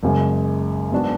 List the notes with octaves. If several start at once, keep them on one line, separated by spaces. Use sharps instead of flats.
F#1 F#2 C#3 G#3
G#2 F#3 B3 D4 F#4